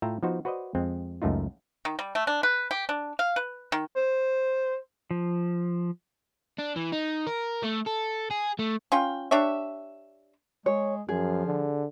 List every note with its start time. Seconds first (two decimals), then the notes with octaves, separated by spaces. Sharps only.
0.02 A2 F4 E5 G5 A#5
0.23 F3 B3 D#4 F#4 C5
0.45 F#4 B4 C5 D5 D#5
0.75 F2 G#3 C4
1.22 C#2 F#2 A3 D#4 F4
1.85 D#3
1.99 G3
2.15 A3
2.27 D4
2.43 B4
2.71 G4
2.89 D4
3.19 F5
3.36 B4
3.72 D#3
3.96 C5
5.11 F3
6.59 D4
6.76 E3
6.93 D#4
7.27 A#4
7.63 A3
7.87 A4
8.30 G#4
8.59 A3
8.92 C#4 F4 G5
9.31 D4 G4 C#5 E5
10.66 G#3 C#5
11.09 F#2 F3 G#4
11.46 D3